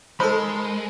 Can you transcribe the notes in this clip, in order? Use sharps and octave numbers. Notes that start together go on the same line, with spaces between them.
G#3 D#4 A4 A#4 C5 B5